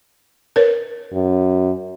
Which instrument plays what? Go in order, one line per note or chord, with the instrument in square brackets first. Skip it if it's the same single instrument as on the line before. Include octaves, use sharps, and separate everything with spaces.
[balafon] A#4 B4 C#5
[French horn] F#2